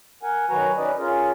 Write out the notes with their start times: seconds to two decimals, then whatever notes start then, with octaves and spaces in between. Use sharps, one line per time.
0.23 A#4 F#5 G#5
0.49 D#3 F#3 F#4 B4 G#5 A#5
0.77 C#4 D#4 B4 D5 D#5
0.98 C#4 F4 G#4 A#4